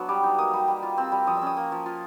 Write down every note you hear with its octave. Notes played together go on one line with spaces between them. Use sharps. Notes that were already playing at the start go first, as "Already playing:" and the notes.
Already playing: F#3 B3 D4
G3 D6
D#4
A#3 D#6
G3
G3
F4
C4 E6
G3
F3 D#6
C#4 E6
D#6
A#3
F3
F4